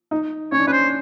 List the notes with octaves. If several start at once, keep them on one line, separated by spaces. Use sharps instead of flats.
D#4
C#4 C#5
D4
C#4 B4
C5